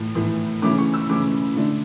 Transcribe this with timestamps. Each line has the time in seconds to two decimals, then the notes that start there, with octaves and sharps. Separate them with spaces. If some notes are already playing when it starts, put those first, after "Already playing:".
Already playing: A2 E3 A3
0.15 A2 E3 A3
0.62 C#3 E3 A3 C#4 D6
0.78 C#6
0.94 E6
1.09 C#3 E3 A3 C#4 D6
1.56 D3 A3 D4